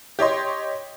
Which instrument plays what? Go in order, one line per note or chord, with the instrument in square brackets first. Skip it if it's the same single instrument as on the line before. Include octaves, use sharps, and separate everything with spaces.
[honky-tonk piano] G4 C#5 D#5 C6